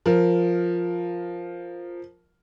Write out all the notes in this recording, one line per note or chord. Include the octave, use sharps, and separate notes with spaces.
F3 A#4